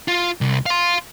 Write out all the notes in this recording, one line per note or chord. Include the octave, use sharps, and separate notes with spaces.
F4
C2
F5 C6